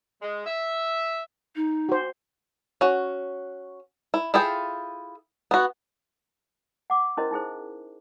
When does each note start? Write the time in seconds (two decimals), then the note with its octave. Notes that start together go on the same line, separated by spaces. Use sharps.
0.22 G#3
0.46 E5
1.56 D#4
1.89 F#4 C5
2.81 C#4 F#4
4.14 E4
4.34 E4 F4 G#4 A4 G5
5.51 B3 F#4
6.90 F#5 D6
7.17 C#4 E4 F#4 A#4 C5 D#5
7.31 D#4 E4 G#4 C5